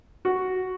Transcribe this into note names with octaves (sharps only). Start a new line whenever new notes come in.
F#4